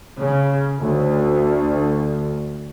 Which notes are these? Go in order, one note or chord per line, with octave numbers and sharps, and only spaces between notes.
C#3
D2